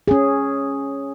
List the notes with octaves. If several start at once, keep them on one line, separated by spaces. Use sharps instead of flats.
C#4 G#4